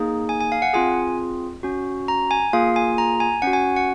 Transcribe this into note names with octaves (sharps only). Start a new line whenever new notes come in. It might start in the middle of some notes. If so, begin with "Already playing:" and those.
Already playing: A#3 D#4 G#4
G#5
G#5
F5
F#5
C4 F4 G#4 G#5
C#4 F#4
A#5
G#5
A#3 F4 G#4 F5
G#5
A#5
G#5
C#4 F#4 F#5
G#5
F#5